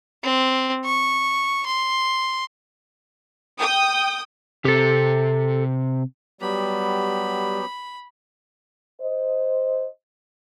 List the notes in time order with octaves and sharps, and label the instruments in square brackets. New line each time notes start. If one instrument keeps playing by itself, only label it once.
[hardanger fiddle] C4
C#6
C6
[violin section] G5 D#6
[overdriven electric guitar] C3 [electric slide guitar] G4 A4
[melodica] F#3 B3 G4 [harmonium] G3 [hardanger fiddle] B5
[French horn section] C5 D#5